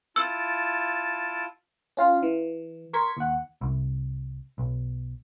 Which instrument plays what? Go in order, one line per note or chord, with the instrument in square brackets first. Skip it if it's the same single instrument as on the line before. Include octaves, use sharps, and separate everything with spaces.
[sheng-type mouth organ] E4 F4 A5 [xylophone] E6
[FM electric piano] C#4 F4 F5
E3
A#4 C6 C#6 G#6 B6 C#7
D#2 F#5
[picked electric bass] C2
B1